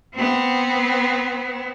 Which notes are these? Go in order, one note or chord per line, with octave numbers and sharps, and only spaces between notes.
B3 C4